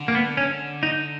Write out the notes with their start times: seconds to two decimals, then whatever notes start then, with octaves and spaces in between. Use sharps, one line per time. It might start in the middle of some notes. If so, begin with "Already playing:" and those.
Already playing: D3
0.08 A#3
0.15 B3
0.37 C#4
0.83 D#4